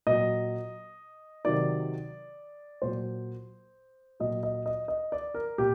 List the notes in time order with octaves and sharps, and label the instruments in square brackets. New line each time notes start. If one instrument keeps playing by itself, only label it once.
[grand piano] A#2 F#3 D#5
C3 D#3 F#3 D5
A#2 F#3 C5
A#2 F#3 D#5
D#5
D#5
D#5
D5
A#4
A#2 G4